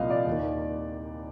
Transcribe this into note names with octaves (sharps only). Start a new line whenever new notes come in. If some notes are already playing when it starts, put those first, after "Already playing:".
Already playing: C2 A#2 F3 D#5 F5
D5
D#2
D#3